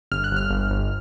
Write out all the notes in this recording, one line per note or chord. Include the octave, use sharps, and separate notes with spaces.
G1 F6
F#6
G1
F6
G1
G1